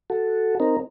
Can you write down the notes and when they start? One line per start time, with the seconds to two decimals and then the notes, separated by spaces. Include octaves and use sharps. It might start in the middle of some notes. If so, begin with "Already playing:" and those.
0.10 F#4 A4
0.60 C4 D#4 A#4